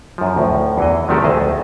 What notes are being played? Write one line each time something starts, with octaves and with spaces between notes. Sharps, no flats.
F#2 F3
D2 A2
E2 E3 D#5
C3 D#3 F3 A3 F#4 G4
D2 A2 G#4 D#5 A5